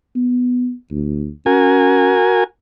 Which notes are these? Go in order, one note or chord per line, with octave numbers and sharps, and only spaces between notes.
B3
D2
C#4 F#4 A#4 G#5